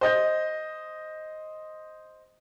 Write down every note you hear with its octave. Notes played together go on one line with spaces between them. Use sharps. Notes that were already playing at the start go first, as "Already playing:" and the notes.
C5 D#5 G6